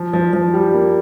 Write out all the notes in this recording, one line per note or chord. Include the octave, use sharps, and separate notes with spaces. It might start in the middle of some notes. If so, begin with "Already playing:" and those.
Already playing: F3
F3
F3
G3
A#3